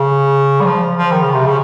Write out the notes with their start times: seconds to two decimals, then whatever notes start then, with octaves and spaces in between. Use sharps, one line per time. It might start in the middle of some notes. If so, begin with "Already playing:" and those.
Already playing: C#3
0.61 G3
0.65 F3
0.96 F3
1.12 D#3
1.23 C#3
1.34 C3
1.46 C#3